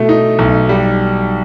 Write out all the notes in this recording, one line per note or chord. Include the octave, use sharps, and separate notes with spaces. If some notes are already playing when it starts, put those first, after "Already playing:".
Already playing: B2 A3
D#4
B1
G3